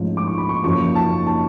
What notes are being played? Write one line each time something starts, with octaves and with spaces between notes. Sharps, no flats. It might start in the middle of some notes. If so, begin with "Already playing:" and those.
Already playing: A1 G#2 F3
D6
C#6
B5
C#6
F#1 F#2 F3 C#6
A5
A5